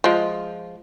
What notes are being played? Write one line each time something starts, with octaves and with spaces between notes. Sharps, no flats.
F3 G#3